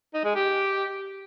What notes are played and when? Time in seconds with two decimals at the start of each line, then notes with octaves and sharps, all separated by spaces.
0.14 D#4
0.25 G#3
0.35 G4